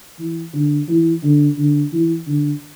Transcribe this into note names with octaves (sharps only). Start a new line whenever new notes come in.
E3
D3
E3
D3
D3
E3
D3